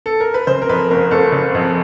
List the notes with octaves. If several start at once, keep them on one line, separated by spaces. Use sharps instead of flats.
A4
A#4
B4
C#3 C5
A#4
F2 B4
F#1 A#4
F#1 A4
C#3
F2